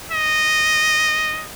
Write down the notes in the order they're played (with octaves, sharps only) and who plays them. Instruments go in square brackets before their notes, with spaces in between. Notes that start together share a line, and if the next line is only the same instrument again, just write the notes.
[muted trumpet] D#5